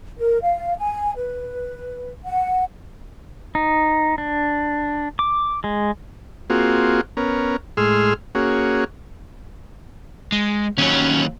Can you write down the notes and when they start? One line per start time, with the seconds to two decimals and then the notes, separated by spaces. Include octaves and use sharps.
0.18 A#4
0.42 F5
0.77 G#5
1.16 B4
2.24 F#5
3.55 D#4
4.18 D4
5.19 D6
5.64 G#3
6.50 A#3 C4 F4 F#4 G#4
7.17 B3 C#4 A#4
7.77 A2 G#3 G#4 C6 E6 F6
8.35 A#3 C#4 F#4 G#4
10.32 G#3
10.78 D#2 F#3 C#4 C#5